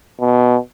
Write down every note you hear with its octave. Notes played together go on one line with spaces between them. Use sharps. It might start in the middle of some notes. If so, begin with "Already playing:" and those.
B2